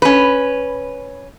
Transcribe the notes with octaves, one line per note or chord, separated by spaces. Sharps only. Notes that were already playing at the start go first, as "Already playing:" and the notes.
C#4 B4